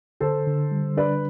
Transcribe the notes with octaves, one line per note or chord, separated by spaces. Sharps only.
D3 A4 C5
D3
G3
D4 B4 D5